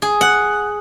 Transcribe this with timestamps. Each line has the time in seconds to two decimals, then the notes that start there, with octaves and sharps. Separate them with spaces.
0.02 G#4
0.21 F#5